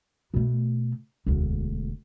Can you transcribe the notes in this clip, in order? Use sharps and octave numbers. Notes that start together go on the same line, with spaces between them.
B2 A3
E1 D2